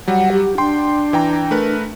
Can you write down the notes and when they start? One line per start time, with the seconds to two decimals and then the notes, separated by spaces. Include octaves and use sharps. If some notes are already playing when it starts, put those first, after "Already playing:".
0.08 F#3 G3 F#5
0.32 G4
0.58 D4 G5 C6
1.13 E3 G5 A#5
1.51 A3 A#4 B4